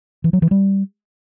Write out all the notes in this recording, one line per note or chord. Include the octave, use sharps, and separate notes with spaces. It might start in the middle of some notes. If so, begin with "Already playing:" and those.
E3
F#3
E3
G3